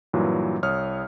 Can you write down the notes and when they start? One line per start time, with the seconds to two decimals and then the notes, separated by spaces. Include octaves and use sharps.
0.13 G2 A#2 E3 F#3
0.63 C2 C#5 D#6 F6